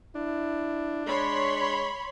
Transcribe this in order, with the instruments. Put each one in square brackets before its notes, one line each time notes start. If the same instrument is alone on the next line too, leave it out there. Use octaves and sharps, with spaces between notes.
[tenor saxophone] D4 [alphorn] E4
[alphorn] G#3 [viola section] C#5 B5 C6